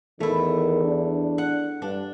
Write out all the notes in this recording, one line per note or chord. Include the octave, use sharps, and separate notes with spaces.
E2 D#3 A3 E4
D4
F#5
G2 D4